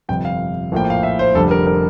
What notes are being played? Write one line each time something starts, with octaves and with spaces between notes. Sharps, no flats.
G1 F2 C3 G5
F5
A#1 A2 F3 A#3 G5
F5
E5
C5
F1 F2 D3 G3 A4
A#4
A#4